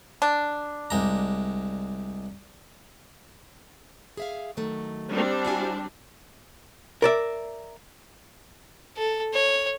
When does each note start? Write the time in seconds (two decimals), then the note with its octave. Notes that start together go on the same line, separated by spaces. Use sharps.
0.22 D4
0.90 C2 G#3 A#5
4.17 G#4 E5 F5
4.57 D#3 F#3 A3
5.10 G3 C4 D4
5.45 E4 F#4 G#5
7.02 A#4 D5 E5
8.97 A4
9.33 C#5